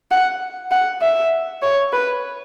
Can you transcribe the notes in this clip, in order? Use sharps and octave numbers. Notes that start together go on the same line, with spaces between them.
F#5
F#5
E5
C#5
B4